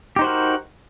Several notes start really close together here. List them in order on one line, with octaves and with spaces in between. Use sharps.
G4 D#4 C5 F#4 A#4